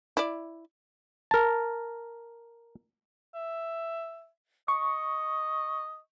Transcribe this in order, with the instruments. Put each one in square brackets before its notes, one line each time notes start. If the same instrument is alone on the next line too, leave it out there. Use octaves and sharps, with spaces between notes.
[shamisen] E4 D5
[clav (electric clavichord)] A#4 A5
[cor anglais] E5
[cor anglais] D#5 [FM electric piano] C#6